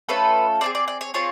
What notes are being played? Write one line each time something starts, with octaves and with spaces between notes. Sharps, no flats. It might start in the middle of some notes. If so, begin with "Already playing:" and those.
A3 C#4 F4 A4 B4
C4 F4 G#4 D5
D5
D5
C#5
C4 F4 G#4 C#5